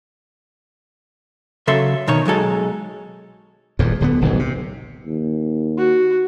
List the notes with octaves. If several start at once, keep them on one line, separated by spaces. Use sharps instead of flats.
C#3 F#3 A4 E5 C6
B2 D#3 C#5
B1 F#3 G#3 A4
D#1 E2 A#2
D1 D3 B3
D1 B1 G#2
C3
D#2
F#4